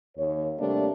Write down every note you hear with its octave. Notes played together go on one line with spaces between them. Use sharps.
D#2 C#5
C3 G3 A3 A#3 D4